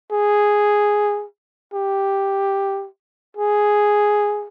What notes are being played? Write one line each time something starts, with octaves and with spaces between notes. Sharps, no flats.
G#4
G4
G#4